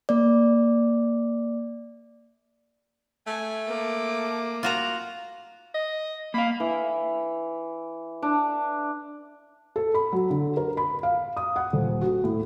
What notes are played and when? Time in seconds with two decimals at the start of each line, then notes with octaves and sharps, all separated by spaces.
0.09 A#3 D5
3.27 A3 G#5
3.67 A#3 D6
4.63 F4 F#4 A#5
5.74 D#5
6.34 A#3 F5 B5
6.60 E3
8.22 D4
9.76 A4
9.94 B5
10.13 F#3
10.30 D3
10.57 A#4
10.77 B5
11.03 F5
11.37 D#6
11.56 F#5
11.73 D#1
12.01 F#4
12.24 A2